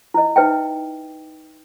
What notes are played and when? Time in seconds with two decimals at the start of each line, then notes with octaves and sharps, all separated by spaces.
0.14 E4 D#5
0.36 D#4 B4 E5 G5